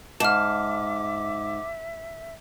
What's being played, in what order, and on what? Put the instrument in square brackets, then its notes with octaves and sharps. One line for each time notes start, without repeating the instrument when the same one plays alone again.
[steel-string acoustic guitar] G#2 [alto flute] E5 [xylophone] A5 F6 [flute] D6